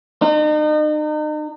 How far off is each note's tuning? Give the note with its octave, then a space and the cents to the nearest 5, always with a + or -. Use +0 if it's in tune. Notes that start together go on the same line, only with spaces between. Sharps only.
D#4 -40